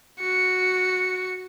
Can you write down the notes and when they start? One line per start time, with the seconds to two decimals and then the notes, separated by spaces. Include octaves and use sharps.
0.19 F#4 C#7